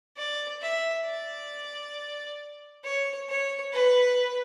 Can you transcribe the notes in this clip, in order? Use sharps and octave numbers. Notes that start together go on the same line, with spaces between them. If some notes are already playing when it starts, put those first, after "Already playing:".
D5
E5
D5
C#5
C#5
B4